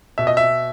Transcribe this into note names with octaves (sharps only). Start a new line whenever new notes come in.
B2 E5
D#5
E5